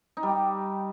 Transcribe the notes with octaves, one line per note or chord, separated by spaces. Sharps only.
D#4
G3
G4